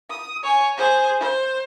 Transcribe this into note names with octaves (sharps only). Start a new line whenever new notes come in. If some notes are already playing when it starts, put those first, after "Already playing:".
D#6
C#5 G#5
G#4 C5
C5